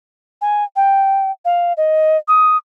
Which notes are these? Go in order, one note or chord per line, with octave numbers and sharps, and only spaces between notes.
G#5
G5
F5
D#5
D#6